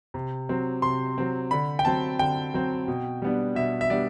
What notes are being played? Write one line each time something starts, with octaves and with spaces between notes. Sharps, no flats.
C3
F#3 C4
C3 C6
F#3 C4
D3 B5
G5
F#3 C4 A5
D3 G5
F#3 C4
B2
G3 B3 D4
B2 E5
E5
G3 B3 D4 D5